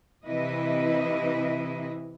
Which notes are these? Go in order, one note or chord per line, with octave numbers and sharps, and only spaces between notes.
C3 E3 E4 B4 D#5